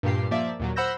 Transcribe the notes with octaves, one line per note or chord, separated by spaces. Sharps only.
G2 A#2 G4 C7
F3 A#3 D5 E5
D#2 A#2 F#3
C5 F#5 B5 E6 G6 A#6